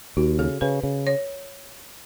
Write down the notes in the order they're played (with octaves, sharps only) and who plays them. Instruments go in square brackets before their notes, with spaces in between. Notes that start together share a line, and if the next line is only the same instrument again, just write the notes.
[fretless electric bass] D#2 [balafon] F#4
[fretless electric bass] C#3 [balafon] A4
[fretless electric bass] C#3 [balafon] B4
[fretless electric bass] C#3
[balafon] C#5